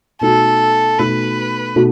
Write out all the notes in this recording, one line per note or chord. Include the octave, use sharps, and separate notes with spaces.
B2 A3 D#4 F#4 A4
B2 A3 D#4 F#4 B4
B2 A3 D#4 F#4